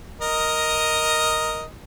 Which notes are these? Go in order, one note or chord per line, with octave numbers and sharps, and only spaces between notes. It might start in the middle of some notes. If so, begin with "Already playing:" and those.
A#4 D#5